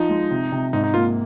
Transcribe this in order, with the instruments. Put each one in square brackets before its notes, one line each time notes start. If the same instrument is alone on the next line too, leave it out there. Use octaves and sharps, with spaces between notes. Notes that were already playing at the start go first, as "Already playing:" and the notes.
Already playing: [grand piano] F3 [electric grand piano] D#4
[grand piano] G#3
C3
C3
[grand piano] G#2 [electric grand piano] D#4
[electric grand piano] D#4
[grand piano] A#3 [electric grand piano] F4